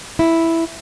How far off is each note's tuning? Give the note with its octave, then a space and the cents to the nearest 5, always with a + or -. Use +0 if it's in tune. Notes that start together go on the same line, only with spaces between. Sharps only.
E4 +0